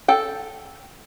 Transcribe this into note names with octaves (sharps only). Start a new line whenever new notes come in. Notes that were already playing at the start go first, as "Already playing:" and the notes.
A4 G5